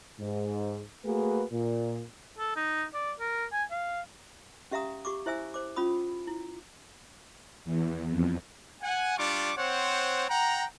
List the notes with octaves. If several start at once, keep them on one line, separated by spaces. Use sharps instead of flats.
G#2
A3 A#3 F#4 G#4 B4
A#2
A4
D#4
D5
A#4
G#5
F5
C#4 G4 E5 F5 A#5 D#6
G4 C#6 D6
E4 C5 E5 G#5 E6
C5 D6
C#4 F4 B5 D#6
E4
E2
F2
F#5 G#5
G3 D4 F4 C#6 D6
C4 C5 C#5 F#5
F#5 G5 A#5